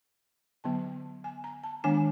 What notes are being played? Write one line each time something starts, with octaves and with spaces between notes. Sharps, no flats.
D3 F#3 B3 A5
G#5
A#5
A5
D#3 G#3 B3 D4 G#5